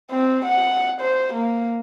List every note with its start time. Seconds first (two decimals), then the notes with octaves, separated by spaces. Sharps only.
0.11 C4
0.45 F#5
1.01 C5
1.34 A#3